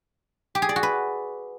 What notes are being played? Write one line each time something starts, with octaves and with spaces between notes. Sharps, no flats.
G4
G#4
D5
F#4
B4